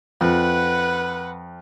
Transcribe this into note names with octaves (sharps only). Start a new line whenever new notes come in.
F2 B4 F#5